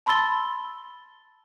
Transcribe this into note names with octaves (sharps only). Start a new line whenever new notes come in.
A5 B5 C6 E6 A6 G7